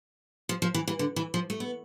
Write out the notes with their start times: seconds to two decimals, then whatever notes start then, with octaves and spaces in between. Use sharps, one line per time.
0.49 F3
0.62 F3
0.74 E3
0.88 E3
0.99 D3
1.16 E3
1.34 F3
1.50 A3
1.60 B3